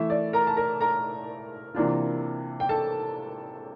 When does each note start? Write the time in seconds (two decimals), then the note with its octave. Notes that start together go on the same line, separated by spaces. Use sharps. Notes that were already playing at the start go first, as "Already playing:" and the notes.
Already playing: E3 A3 E4 E5
0.10 D5
0.33 A#4 A#5
0.47 A5
0.57 A#4 A#5
0.81 A#4 A#5
1.75 C3 E3 A#3 D4 F4
2.60 G5
2.69 A4 A5